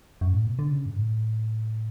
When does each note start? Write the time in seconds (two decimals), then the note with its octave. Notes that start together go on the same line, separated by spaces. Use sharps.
0.21 F#2
0.33 A2
0.46 B2
0.59 D3
0.71 C#3
0.86 G2
0.96 A2